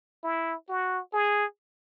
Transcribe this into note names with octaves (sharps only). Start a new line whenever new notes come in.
E4
F#4
G#4